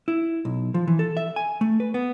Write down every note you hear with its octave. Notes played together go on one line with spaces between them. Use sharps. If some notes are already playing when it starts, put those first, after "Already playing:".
E4
B1
F3
E3
A4
E5
G#5
A3
B4
B3